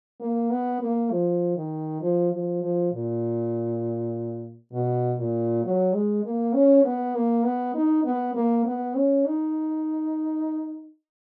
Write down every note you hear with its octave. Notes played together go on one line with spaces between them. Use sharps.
A#3
B3
A#3
F3
D#3
F3
F3
F3
A#2
B2
A#2
F#3
G#3
A#3
C#4
B3
A#3
B3
D#4
B3
A#3
B3
C#4
D#4